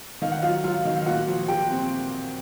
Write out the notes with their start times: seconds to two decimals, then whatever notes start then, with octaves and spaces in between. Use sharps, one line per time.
0.22 D#3 F5
0.32 F#5
0.42 F#3 F4 F5
0.64 F#3 F4 F5
0.85 D#3
0.96 F5
1.06 A#2 F#4 F#5
1.28 F3
1.48 A#2 G4 G5
1.70 C4